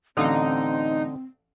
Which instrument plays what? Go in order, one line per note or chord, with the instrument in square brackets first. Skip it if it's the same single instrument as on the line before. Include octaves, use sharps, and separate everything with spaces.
[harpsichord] A1 F5 F#5 [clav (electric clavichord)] D3 [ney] C4 [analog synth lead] D#4